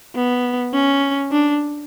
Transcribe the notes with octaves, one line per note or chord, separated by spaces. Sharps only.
B3
C#4
D4